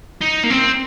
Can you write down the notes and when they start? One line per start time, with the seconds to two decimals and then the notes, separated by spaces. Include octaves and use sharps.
0.21 D#4
0.44 A#3
0.50 C4